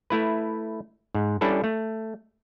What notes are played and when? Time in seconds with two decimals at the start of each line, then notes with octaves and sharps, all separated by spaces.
0.10 A3 E4 B4
1.15 G#2
1.41 G3 C#4 D4 E4 A4 B4
1.64 A3